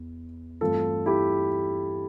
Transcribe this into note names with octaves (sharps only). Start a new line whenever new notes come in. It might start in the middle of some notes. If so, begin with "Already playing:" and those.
Already playing: E2
G2 E3 A3 C4 F4 A4
E4 G4